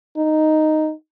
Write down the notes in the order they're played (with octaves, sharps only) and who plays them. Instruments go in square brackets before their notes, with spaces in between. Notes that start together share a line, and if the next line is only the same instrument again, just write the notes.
[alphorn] D#4